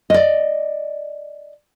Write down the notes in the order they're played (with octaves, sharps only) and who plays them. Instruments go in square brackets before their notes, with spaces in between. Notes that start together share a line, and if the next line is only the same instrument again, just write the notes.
[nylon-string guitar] D5 D#5